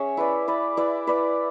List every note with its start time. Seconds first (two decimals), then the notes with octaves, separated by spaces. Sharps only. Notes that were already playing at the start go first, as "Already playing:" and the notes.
Already playing: C#4 G#4 C#5 E5
0.17 E4 B4 D5
0.48 E4 B4 D5
0.77 E4 B4 D5
1.07 E4 B4 D5